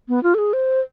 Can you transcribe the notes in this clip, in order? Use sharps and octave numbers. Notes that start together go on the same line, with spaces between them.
B3
F4
A4
G#4
C5